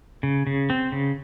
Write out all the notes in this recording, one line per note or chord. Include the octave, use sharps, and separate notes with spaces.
C#3
C#3
C4
C#3